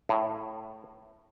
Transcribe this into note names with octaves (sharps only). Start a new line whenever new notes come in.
A2